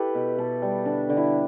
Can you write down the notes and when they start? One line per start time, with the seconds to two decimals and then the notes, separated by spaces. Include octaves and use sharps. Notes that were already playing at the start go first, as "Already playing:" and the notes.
Already playing: E4 G4 A4 B4
0.15 B2
0.38 B2 A4
0.62 G3
0.85 D3 D4
1.09 D3
1.17 E4